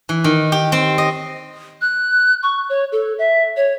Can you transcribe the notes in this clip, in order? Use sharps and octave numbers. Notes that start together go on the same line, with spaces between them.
E3
D#3
G4
C4
D#5
F#6
C#6
C#5
A4
E5
C#5